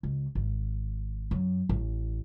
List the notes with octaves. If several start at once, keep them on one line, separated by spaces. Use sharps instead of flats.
C#2
G#1
F#2
A1